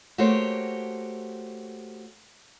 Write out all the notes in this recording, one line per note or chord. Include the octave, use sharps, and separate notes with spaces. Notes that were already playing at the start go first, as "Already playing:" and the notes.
A3 A#3 F#4 G4 C5 C#5